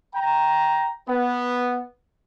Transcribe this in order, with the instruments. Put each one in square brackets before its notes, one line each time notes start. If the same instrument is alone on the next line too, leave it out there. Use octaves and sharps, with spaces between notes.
[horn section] G5 A#5
B3